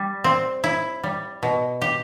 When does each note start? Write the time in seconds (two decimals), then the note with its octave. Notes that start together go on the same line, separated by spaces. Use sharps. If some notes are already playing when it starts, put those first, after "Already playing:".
Already playing: G3
0.24 C4
0.64 E4
1.04 G3
1.43 B2
1.82 G4